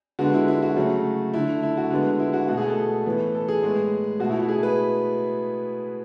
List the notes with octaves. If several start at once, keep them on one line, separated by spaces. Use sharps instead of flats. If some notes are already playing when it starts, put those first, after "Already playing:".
D3 G#3 B3 F#4
E4
E4
F#4
C#3 F#3 A3
D3 A3 E4
E4
F#4
D3 G#3 B3
E4
F#4
B2 A3 F#4
G#4
A4
A2 E3 B3
A4
G#4
A2 G#3 B3
B2 A3 F#4
E4
E4
G#4
B4